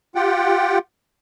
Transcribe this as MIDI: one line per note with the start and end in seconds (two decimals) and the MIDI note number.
0.15 0.78 65
0.15 0.78 67
0.15 0.78 78
0.15 0.78 79